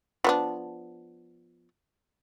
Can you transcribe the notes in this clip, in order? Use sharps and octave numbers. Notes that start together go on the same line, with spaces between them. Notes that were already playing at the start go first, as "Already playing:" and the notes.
F3 B3 D4